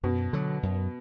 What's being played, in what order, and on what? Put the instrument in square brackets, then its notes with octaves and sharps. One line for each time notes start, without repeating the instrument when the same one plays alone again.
[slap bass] F#2 [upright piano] B2
[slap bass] D3 F#3
F#2